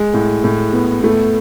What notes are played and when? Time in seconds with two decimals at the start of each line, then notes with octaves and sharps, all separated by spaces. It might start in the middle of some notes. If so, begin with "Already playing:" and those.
Already playing: G#3
0.13 A2
0.44 A2
0.73 B3
1.04 A3